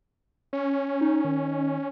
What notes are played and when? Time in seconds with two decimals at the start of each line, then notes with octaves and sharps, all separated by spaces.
0.53 C#4 C#5
1.01 D#4
1.25 D#3